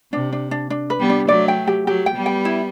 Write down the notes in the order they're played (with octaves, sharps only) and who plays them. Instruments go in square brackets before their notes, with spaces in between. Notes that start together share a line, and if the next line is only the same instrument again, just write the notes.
[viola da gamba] C3 [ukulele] D4
[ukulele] D4
D4
D4
B4
[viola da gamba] G3 B3
[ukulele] D4
[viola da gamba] F#3 A3 [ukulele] D5
[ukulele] G5
G4
[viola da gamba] F#3 A3 [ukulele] G4
[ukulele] G5
[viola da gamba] G3 B3
[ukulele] G5
E4